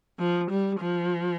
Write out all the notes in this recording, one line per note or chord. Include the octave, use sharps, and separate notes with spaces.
F3
G3
F3